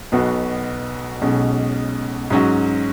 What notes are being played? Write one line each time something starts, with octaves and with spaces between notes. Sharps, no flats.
B1 B2 B3 F#4
B1 B2 G#3 C#4
G#2 F#3 C#4 F#4